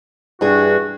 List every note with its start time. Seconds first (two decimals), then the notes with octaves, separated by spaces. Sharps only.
0.41 G2 E3 D4 F#4 G#4